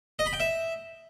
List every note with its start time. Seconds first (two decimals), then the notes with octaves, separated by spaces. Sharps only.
0.19 D#5
0.26 B5
0.33 G5
0.40 E5